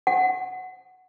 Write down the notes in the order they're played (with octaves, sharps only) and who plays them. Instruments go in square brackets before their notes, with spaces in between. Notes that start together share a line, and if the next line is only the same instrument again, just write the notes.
[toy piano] F#5